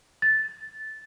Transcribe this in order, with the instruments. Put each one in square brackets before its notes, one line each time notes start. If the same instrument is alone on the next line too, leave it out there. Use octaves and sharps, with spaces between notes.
[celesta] A6